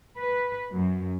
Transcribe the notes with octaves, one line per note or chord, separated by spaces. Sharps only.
B4
F#2